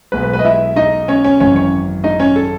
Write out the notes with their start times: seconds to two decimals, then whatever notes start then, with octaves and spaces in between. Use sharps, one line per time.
0.12 B1 B2 G#3 B3 B4
0.23 B4
0.33 B4
0.39 D#5
0.44 E4 E5
0.76 D#4 D#5
1.08 C#4 C#5
1.24 C#4 C#5
1.40 G#1 F#2 E3 C#4 C#5
1.56 C#4 C#5
2.04 D#4 D#5
2.20 C#4 C#5
2.36 A4